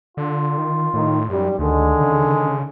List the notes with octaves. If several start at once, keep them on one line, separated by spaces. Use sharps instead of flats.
D3 F4
D#3
A2 D#3
F#2 G3
D2 D3 D#3 G#3
C#3